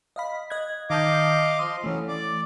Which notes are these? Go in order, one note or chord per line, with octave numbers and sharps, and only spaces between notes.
D#5 F5 B5
D#5 F#6 G#6
D#3 D#5 F5 A5 D6 G6
F3 C6 D#6
E3 F#3 A3 C#4
D5 D6